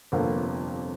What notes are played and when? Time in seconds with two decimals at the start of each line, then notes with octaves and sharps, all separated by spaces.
0.12 G1 F2 C3 F3 A#3